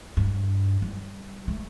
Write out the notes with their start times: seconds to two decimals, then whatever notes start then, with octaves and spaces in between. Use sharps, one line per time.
0.17 G2
0.82 G3
1.48 A3